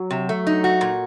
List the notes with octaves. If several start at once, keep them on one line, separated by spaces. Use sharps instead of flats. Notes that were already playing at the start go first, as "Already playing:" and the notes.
Already playing: F#3
C3
A3
D#4
F#4
A#2